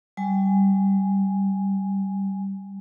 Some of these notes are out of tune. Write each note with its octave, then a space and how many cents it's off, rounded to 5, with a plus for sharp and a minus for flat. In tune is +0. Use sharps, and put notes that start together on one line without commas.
G3 -10 G#5 +0